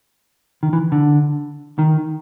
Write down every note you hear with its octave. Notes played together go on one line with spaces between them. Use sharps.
D#3
E3
D3
D#3